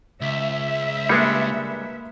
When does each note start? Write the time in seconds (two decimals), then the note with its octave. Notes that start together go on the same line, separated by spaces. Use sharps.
0.21 C#2 E5
1.09 G3 G#3 A#3 D4 B4 C#7